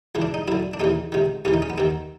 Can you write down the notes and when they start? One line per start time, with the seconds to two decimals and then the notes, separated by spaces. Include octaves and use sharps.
0.15 C#2 C#3 E3
0.22 D4
0.34 D#4
0.48 F#2 D3 E4
0.74 D4
0.80 D#2 C#3 E3 D#4
1.12 C#2 C3 D#3
1.45 D#2 C#3 E3 C#4
1.54 D#4
1.62 C#4
1.70 B3
1.78 D#2 D#3 C4